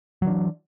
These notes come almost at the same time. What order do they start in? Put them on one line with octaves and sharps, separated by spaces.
F#3 D#3 D4 E3